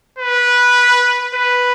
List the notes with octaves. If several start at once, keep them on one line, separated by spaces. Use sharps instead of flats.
B4
B4